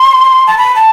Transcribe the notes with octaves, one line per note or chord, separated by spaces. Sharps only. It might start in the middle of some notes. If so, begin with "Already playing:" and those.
Already playing: C6
A5
B5
A5